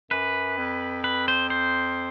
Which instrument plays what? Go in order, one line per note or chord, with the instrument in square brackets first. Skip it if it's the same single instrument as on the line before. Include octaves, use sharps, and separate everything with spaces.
[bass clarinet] F#2 [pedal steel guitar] B4
[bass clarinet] F2
[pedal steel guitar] B4
C5
C5